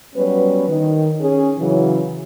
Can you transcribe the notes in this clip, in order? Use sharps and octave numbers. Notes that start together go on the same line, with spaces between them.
F#3 G3 B3 C#4 B4
D#3
C#4 G#4
C#3 E3 F#3